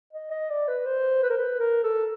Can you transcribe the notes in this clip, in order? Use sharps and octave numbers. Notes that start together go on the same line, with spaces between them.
D#5
D#5
D5
B4
C5
B4
A#4
B4
A#4
A4